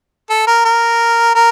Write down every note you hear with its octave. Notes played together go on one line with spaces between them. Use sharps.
A4
A#4
A#4
A#4